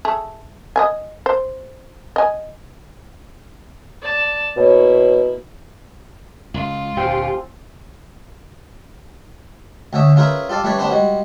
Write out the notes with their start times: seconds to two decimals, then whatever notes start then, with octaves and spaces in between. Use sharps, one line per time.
0.05 A3 G#4
0.76 D#5 E5 G#5
1.26 C5
2.16 D#5 G#5
4.02 D5 A5
4.57 B2 A#3 E4 C#5
6.54 C#2 F4
6.97 D2 A#2 C4 G4 F5 G#5
9.93 D2 D3 C#4 E5 D#6
10.16 C#4 F4 G#4 A#4 B4 E5
10.49 F4 G4 A4 D5 F5
10.64 G3 A3 C#4 B4 C#5 D5
10.79 B3 C#4 D4 G4 B4 C5
10.90 G3 G#3 F#4